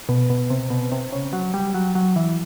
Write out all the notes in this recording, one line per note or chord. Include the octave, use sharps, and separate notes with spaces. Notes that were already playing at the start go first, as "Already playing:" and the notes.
B2
B2
C3
B2
C3
C#3
F#3
G3
F#3
F#3
E3